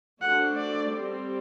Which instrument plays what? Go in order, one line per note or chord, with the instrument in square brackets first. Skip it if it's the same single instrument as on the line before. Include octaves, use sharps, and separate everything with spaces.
[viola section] A3 D4 F#4 A4 C5 [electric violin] F#5
[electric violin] D5
[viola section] G3 C4 G4